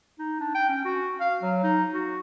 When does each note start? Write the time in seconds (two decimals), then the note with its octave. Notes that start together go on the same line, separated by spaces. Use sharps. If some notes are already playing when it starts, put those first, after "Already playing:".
0.19 D#4
0.40 D4
0.55 G5
0.69 C#4
0.85 F#4
1.21 F5
1.43 F#3
1.63 D#4
1.94 F#4